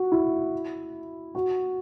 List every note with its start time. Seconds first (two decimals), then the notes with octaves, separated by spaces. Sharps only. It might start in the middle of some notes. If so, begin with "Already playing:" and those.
Already playing: F#4
0.12 E4
1.35 F#4